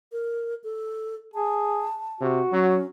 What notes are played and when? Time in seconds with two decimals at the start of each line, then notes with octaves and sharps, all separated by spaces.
0.12 A#4
0.64 A4
1.34 G#4 A5
2.21 C3 F#4
2.52 F#3 C#4